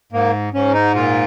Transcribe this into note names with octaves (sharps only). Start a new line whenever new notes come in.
G#2 A#3
G#2 C#4
D#4
A#2 F4